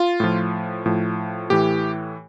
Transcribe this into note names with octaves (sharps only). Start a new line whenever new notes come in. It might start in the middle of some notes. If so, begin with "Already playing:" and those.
Already playing: F4
A2 F3
A2 F3
A2 E3 G4